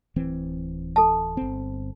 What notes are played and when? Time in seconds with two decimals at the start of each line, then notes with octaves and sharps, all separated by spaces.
0.16 D1 E3 C4
0.96 A4 A5
1.37 G1 C4